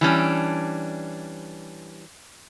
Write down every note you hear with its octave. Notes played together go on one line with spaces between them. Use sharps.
E3 G3 C#4 D4